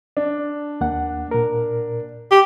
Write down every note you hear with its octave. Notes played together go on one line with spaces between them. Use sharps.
D4
D#2 A#3 F#5
A#2 A#4
G4